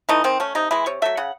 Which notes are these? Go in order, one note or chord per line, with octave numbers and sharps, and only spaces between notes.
E3 A3 D#4
D#3 C4
A3 C#4
C3 D#4
E3 G#3 E4
C3 C#5
F#3 A3 E5
C#3 F#5